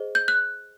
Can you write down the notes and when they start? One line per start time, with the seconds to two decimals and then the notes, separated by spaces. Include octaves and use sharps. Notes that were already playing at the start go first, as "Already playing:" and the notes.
Already playing: G#4 C5 D#5
0.15 G6
0.28 F#6